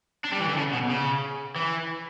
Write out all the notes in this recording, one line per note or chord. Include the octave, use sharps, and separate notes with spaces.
D4
G3
E3
D3
C#3
B2
C#3
E3